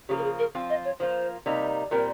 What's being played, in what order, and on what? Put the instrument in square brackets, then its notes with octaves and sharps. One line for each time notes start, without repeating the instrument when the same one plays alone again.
[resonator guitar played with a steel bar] C#3 F3 A#3 [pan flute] G4
[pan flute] A#4
G#4
A#4
[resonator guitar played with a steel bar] F3 C4 F4
[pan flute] D#5
C#5
[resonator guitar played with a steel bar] F3 A#3 F4 [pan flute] C5
[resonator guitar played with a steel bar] C3 G3 A#3 D#4
[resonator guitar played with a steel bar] A#2 G3 C4 [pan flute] A#4